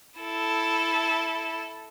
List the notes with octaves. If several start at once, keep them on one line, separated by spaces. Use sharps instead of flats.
E4 A4